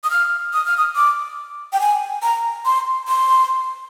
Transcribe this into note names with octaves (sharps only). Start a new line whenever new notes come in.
D#6
F6
D#6
F6
D#6
D6
G5
G#5
A#5
C6
C6